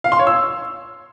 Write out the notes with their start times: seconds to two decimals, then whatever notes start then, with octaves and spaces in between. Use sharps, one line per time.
0.04 F5
0.12 C6
0.19 C#5
0.27 E6